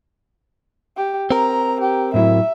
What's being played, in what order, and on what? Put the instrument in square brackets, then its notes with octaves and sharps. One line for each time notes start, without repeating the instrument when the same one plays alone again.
[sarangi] G4
[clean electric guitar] C4 A#4 [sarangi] A#5
[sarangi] G4
[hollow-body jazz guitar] A2 F#3 E4 [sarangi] E5